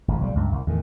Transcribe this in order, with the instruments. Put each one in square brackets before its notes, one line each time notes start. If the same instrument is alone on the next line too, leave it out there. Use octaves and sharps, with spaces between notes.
[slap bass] G#1 F2
B1 F#3 G3
C#2 G2
C2
E2 A2 D#3